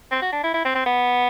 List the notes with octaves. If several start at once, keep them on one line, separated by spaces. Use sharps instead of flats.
C4
F#4
D4
E4
E4
C4
C4
B3